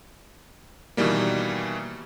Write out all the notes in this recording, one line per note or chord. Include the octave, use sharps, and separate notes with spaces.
B2 D#3 E3 G3 A#3